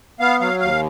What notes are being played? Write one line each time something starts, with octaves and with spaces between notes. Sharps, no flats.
B3 F5
F#3 F5
D#2 F5